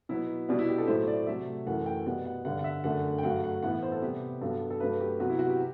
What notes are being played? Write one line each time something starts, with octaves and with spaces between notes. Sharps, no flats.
B2 F#3 B3 E4
B2 G3 B3 D4
E4
G4
A4
A2 F#3 A3 C5
C5
D5
C3 F#3 A3 E5
F#2 E3 A3 F#5
G5
B2 G3 B3 F#5
F#5
G2 D3 G3 F#5
F#5
E5
F#2 D3 A3 F#5
G5
G2 F#3 A3 F#5
F#5
A2 E3 B3 F#5
F#5
C5
A4
C3 G3 B3 G4
G2 F#3 B3 A4
A4
G2 F#3 A3 B4
G4
C3 F#3 B3 F#4
E4
F#4
G4